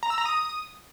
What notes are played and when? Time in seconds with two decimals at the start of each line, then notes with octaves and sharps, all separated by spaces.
0.03 A#5
0.10 E6
0.18 A#5
0.25 D#6